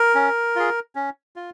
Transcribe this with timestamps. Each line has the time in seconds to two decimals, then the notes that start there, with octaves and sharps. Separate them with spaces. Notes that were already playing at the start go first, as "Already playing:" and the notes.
Already playing: A#4
0.15 C#4
0.56 F4 G#4
0.95 C#4
1.36 F4